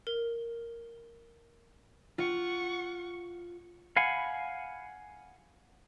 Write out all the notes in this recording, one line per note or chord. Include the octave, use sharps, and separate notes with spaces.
A#4
F4 F#5 C#6
F5 F#5 G#5 B5